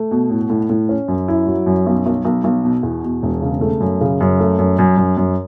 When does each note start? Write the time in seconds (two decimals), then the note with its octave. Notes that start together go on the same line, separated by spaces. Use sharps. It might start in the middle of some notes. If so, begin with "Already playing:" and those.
Already playing: A3
0.11 B2
0.30 A2
0.50 A2
0.69 A2
0.89 C#4
1.08 F#2
1.28 E4
1.47 F#3
1.66 F#2
1.86 B1
2.06 B1
2.25 B1
2.44 B1
2.64 B2
2.83 E2
3.03 B2
3.23 E1
3.42 C#3
3.61 A3
3.80 F#2
4.01 C#3
4.21 F#2
4.40 A3
4.59 F#2
4.79 F#2
4.97 F#2
5.17 F#2